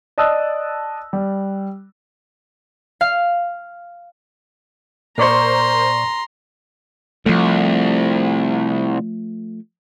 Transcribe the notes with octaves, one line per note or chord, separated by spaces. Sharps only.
D5 D#5 A5 D#6 E6 F#6
G3
F5
A#2 A#4 C5 D5 A#5 C6 C#6
C2 F3 A3